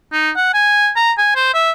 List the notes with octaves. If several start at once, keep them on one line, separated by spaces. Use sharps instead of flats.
D#4
F#5
G#5
A#5
G#5
C5
E5